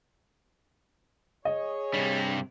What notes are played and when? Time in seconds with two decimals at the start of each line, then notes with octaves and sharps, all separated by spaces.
1.45 G#4 C#5 D#5
1.94 G2 C3 G3 D4